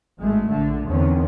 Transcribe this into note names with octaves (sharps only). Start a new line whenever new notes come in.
G#1 G#3 A3
A#1 D3
E2 D3 D#3 C4 C#4